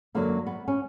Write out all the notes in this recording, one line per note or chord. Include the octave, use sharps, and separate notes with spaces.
F#2 D3 F#3 A#3
B3
C#4